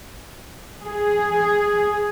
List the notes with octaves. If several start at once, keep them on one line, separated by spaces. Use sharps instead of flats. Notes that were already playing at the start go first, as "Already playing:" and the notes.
G#4